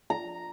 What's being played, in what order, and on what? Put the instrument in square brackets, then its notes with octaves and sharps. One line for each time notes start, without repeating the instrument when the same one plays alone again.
[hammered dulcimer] A#5